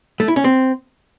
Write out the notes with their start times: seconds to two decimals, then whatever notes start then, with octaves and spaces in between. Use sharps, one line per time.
0.20 A3
0.28 E4
0.36 C#4
0.44 C4